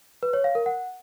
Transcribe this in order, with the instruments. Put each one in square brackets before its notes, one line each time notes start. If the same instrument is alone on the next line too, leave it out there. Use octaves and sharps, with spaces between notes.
[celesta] B4
C#5
F5
A#4
F#5